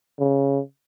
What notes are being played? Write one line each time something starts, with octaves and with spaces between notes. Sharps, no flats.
C#3